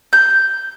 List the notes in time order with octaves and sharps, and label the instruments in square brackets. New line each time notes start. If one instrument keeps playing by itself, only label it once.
[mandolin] G6